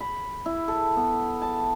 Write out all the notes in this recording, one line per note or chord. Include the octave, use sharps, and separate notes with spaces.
B5
E4
A4
B3
A5